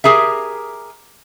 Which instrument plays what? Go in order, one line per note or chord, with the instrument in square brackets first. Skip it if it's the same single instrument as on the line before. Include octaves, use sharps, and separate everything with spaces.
[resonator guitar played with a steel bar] G4 G#4 A#4 E5